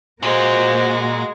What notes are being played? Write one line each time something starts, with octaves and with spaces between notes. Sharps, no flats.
A#2 G#3 A#3 F#4 C5